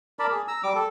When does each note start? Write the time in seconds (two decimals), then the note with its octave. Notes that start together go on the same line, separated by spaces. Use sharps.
0.19 A#4 D5 A5 B5
0.31 G#4
0.48 A#5 E6
0.63 G3 D6
0.75 A4